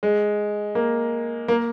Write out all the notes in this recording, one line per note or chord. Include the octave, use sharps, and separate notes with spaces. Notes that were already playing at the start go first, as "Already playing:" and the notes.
G#3
A#3
A#3